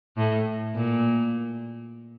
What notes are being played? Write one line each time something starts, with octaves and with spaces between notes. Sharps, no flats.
A2
A#2